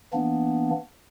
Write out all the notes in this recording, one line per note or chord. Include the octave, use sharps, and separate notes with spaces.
E3 A#3 B3 D4